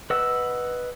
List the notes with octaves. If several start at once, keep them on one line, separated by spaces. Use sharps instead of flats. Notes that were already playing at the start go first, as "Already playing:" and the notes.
B4 D#5 F#5 E6